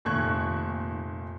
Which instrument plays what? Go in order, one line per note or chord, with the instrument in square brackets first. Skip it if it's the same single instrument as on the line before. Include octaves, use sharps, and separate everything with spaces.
[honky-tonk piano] F1 A#2 D#3 C#6 F#6 G#6